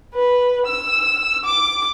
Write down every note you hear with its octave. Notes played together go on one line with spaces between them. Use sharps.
B4
E6
D6